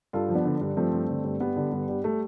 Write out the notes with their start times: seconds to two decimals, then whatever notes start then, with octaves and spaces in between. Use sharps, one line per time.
0.13 G2 F4 A4
0.29 F3
0.35 B3 D4
0.45 D3
0.61 G2
0.77 F3 A3 C4
0.93 G2
1.09 D3
1.24 G2
1.40 G3 B3
1.56 D3
1.72 G2
1.88 G3
2.04 G3 A3